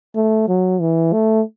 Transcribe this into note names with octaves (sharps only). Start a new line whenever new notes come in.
A3
F#3
E3
A3